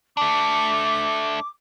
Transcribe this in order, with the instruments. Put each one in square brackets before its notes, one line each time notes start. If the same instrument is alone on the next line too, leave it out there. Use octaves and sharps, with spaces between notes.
[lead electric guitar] A3 D4 [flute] D6